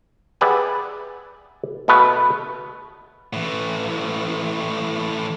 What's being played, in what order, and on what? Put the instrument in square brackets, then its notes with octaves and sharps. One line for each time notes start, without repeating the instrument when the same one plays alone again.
[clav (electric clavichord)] G4 G#4 B4 D5 E5 F#5
B2 A3 B3 B4 F#5
[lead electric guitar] A2 E3